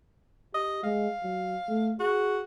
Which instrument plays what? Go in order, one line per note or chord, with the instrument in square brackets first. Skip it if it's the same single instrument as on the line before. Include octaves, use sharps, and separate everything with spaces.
[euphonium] G4 [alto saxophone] D#5
[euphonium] G#3 [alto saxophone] F5
[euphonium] F#3
A3
[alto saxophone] F#4 [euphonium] G#4